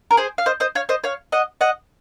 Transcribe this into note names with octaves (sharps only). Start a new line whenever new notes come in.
A#4
G#4 C5
F5
C5 D#5
C5 D#5
C#5 F5
C5 D#5
C#5 F5
D#5 F#5
D#5 F#5